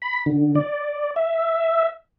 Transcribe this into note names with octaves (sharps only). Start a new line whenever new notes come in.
B5
D3
D5
E5